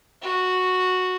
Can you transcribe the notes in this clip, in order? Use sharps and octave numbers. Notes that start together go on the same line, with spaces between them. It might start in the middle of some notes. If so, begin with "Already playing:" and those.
F#4